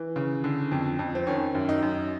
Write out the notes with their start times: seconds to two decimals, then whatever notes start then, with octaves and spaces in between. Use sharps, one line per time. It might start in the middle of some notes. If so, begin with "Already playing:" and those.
Already playing: E3
0.16 C#3
0.44 D3
0.72 F2
0.99 F2
1.15 C4
1.27 D#3 C#4
1.55 F#2
1.69 D#4
1.82 F#2